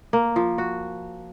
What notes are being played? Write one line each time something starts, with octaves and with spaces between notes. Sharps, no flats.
A#3
F3
F#4